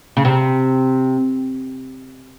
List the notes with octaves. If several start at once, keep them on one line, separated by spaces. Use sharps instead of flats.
C#3
C3